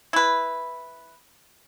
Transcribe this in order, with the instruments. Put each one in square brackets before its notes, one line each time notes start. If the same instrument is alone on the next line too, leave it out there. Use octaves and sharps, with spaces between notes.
[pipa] E4 B4